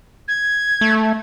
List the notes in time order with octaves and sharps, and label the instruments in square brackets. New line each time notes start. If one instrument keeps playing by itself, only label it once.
[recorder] G#6
[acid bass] A3